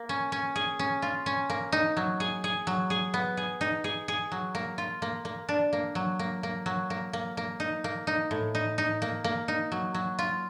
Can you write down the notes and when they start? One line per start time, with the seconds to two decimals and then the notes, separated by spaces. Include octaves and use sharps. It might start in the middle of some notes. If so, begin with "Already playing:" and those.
Already playing: A#3
0.09 C#4
0.32 C#4
0.56 G#4
0.79 C#4
1.02 F4
1.26 C#4
1.50 A#3
1.72 D#4
1.97 F#3
2.20 G#4
2.44 G#4
2.67 F#3
2.90 G#4
3.14 B3
3.37 G#4
3.61 D#4
3.84 G#4
4.08 G#4
4.32 F#3
4.55 A#3
4.78 F4
5.02 A#3
5.25 A#3
5.49 D4
5.73 A#3
5.95 F#3
6.19 A#3
6.43 A#3
6.66 F#3
6.90 A#3
7.13 A#3
7.37 A#3
7.60 D#4
7.84 A#3
8.07 D#4
8.31 A2
8.55 D#4
8.78 D#4
9.02 A#3
9.24 A#3
9.48 D#4
9.72 F#3
9.94 F#3
10.19 F4